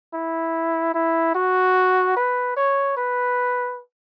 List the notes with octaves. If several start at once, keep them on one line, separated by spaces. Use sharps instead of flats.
E4
E4
F#4
B4
C#5
B4